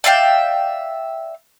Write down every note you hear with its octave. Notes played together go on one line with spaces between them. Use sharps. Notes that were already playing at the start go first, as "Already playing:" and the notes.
D5 E5 F5 G5